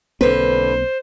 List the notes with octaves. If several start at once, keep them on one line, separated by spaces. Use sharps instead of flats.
B1 D3 A#3 C4 B4 C5